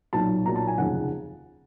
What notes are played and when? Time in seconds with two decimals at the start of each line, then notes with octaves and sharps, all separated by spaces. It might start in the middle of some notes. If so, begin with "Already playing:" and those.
0.13 B1 A#2 F#3 A5
0.45 B1 A#2 F#3 A#5
0.56 A5
0.67 G#5
0.78 F1 D#2 C#3 F3 F#5